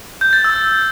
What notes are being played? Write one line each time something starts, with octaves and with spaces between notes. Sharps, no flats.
G6
A6
E6